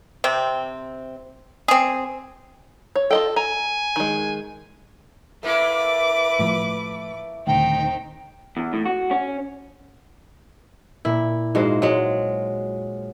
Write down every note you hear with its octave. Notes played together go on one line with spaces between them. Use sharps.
C3 C4
C4 G#4
C#5
F4 A4 D#5 G5
G#5 A#5
D#3 G#3
A3 A#3 E4 B4 D6
A2 F3
D#1 D2 D#3 C4 D#4 G5
E2
A2
F#4
C#4
A#2 E4
G#2 G#3 F4 F#4 C5
F#3 G#3